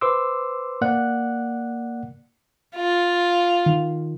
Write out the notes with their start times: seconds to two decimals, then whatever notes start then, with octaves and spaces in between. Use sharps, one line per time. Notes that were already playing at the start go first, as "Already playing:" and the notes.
0.01 B4 C5 C6 D6 E6
0.81 A#3 D5 F#5 F#6
2.76 F4
3.66 D#3